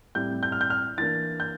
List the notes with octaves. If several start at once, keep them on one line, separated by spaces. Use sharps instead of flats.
A2 G3 C4 G6
G6
F6
G6
F6
E3 A#3 D4 A6
G6